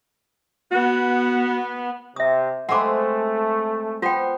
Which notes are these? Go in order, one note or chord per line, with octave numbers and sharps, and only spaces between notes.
B3 F#4
C3 E5 D#6
G#3 A3 C4 B4 F#5 D6
B3 F4 C5 G5